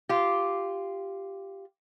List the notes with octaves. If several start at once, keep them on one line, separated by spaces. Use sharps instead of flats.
F4 G4